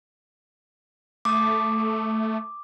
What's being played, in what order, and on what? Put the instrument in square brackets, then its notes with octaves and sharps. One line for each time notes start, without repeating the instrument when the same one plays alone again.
[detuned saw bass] A3 [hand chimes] D6 D#6